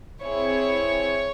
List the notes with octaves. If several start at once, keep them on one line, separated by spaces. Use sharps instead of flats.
C4 E4 G#4 C#5